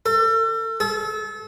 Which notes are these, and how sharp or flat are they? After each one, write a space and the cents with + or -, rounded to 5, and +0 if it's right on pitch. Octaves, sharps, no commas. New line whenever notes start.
A4 +35
A4 -35